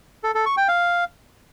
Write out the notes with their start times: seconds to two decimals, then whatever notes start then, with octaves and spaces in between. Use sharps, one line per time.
0.24 A4
0.35 A4
0.46 C#6
0.57 G5
0.68 F5